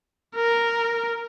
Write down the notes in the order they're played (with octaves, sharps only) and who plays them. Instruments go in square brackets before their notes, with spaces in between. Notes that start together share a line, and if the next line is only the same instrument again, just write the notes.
[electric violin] A#4